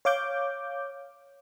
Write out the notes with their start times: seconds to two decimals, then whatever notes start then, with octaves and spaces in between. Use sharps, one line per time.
0.05 C#5 F5 D6 G6